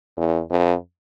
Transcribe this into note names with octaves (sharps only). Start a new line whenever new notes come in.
E2
F2